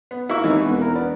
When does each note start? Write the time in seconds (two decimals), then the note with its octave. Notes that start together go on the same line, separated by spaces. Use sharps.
0.11 B3
0.29 A#3 E4 F#4 G#4 E5 C#6
0.44 D#2 E3 G#3 C4 D#4
0.64 E1 B3
0.82 A#4
0.95 B3 D5